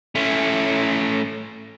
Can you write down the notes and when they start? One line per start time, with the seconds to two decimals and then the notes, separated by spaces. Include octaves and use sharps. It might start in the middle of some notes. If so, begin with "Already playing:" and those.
0.15 A3 C#4